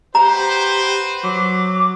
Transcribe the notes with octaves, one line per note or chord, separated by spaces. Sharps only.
F#4 G4 B4 C5 A#5
F#3 D6